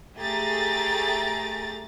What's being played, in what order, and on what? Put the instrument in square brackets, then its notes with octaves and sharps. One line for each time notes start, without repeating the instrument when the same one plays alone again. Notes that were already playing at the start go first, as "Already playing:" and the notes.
[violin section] A3 G4 G#4 A#5 A6